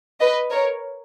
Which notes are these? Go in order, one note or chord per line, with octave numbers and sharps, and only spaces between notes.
B4 D#5
A#4 C#5